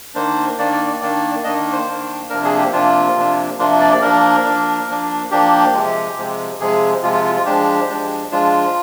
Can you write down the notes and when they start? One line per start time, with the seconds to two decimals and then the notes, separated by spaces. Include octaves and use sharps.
0.14 D#3 A#3 D4 C5
0.58 D#3 A#3 D4 D5
0.73 D5
0.87 D5
1.00 D#3 A#3 D4 D5
1.44 D#3 A#3 D4 D#5
1.73 C5
1.86 D#3 A#3 D4
2.30 C3 F3 A#3 D4 A#4
2.44 G#4
2.58 G4
2.73 C3 F3 A#3 D4 F4
3.16 C3 F3 A#3 D4
3.59 C3 F3 A#3 D4 F4
3.81 D5
3.92 D5
4.02 F3 A#3 D4 A#4
4.45 F3 A#3 D4
4.88 F3 A#3 D4
5.31 F3 A#3 D4 G4
5.74 C3 F3 G#3
6.17 C3 F3 G#3
6.60 C3 F3 G#3 G#4
7.03 C3 F3 G#3 F4
7.13 F4
7.24 F4
7.35 F4
7.46 F3 G#3 D4 G4
7.89 F3 G#3 D4
8.31 F3 G#3 D4 F4